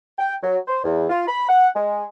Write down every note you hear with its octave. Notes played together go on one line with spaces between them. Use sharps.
G5
F#3
C5
E2
F4
B5
F#5
G#3